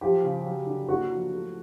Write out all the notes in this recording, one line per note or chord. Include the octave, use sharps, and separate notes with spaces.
F3 G4
C#3
F#3
D3
A#3 F#4
F3
A3